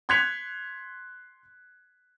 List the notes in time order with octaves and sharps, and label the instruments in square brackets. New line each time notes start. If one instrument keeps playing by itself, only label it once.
[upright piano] C6 F#6 G#6 B6 C#7 F7